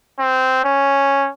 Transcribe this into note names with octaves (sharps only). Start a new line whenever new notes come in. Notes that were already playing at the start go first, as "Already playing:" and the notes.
C4
C#4